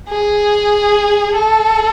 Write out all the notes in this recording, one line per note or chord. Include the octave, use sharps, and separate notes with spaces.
G#4
A4